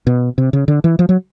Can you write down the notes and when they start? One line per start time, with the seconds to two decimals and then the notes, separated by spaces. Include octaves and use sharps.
0.07 B2
0.38 C3
0.53 C#3
0.68 D3
0.84 E3
0.99 F3
1.09 F#3